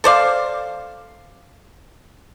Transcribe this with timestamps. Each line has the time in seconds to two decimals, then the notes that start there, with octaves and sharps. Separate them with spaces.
0.04 A4 C5 D5 F5